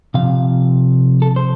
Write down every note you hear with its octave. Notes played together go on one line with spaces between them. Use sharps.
C3 F3 F5
A4
C5